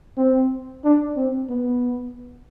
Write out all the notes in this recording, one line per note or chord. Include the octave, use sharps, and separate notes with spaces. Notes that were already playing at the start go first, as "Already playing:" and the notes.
C4
D4
C4
B3